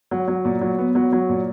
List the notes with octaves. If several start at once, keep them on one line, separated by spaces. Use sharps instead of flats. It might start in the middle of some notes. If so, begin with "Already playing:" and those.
F#3
F#3
A#2
F#3
B3
F#3
F#3
A#2